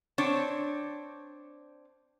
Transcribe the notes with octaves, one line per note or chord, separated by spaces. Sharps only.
C4 D4 C#5